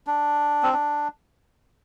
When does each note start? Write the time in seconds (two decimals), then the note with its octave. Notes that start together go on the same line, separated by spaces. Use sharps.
0.07 D4
0.63 C4
0.73 D4